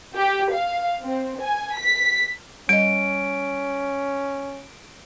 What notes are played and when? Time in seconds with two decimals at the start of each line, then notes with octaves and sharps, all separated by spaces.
0.17 G4
0.53 F5
1.05 C4
1.42 G#5
1.78 B6
2.69 G3 C#4 D#5 D7